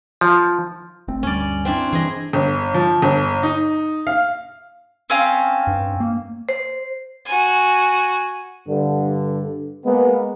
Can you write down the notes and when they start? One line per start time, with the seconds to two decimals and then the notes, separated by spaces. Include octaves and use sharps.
0.21 F3
1.08 G1 A3 C4
1.23 D2 G2 G3 C#4 D5
1.65 C4 D4 E4
1.93 G2 E3 G#4 D#5
2.33 G1
2.74 F3
3.02 G1
3.43 D#4
4.07 F5
5.10 C4 C#4 F5
5.67 G2
6.00 A#3
6.49 C5
7.26 F#4 G#5
8.68 G2 D3
9.85 G#3 A#3 B3